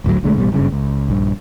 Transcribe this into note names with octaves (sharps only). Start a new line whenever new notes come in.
G#1 D2 A2 F#3
B1 D3 G#3 A3
A1 B2 F3 G3
F#1 G2 C#3
C#2
A#1 G2